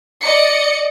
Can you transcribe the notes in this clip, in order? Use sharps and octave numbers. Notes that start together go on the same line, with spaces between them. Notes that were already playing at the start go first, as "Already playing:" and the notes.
D5 D#5 C#7